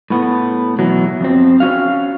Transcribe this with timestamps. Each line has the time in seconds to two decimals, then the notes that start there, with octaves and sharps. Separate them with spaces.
0.10 A2 B3
0.79 B2 E3 F#3
1.20 F2 C4
1.60 C#4 F#4 F5